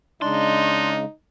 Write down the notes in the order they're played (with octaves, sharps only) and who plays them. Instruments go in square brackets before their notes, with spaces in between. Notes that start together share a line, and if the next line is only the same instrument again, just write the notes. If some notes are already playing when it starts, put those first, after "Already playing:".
[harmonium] C#3 G#3 [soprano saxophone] D4 [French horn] D#4 [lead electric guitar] C6